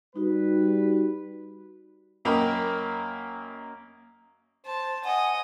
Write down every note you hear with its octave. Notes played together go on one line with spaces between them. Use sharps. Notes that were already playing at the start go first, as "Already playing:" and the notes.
G3 D#4 F#4 B4
F#2 A#3 A#4 D#5 G5 B5
C5 A5
D#5 F#5 G#5